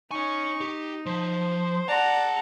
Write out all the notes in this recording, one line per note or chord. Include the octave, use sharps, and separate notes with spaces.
D#4 C#5 G#5 C#6
G4
F3 C5
G#4 D5 F#5 A5 A#5